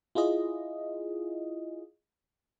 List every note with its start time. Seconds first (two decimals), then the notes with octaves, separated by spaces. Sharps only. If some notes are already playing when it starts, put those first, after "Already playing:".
0.15 E4 F4 G#4 D#5